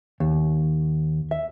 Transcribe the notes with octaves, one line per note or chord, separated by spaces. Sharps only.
D#2
E5